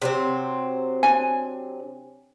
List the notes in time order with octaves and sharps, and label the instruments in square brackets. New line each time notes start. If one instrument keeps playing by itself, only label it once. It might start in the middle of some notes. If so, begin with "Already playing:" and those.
[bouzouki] C3 F#3 C4
[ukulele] D4 G#5